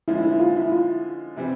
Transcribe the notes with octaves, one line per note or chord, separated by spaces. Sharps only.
D3 F3 G#3 C#4 E4
E4
F4
E4
F4
C3 E3 G3 C4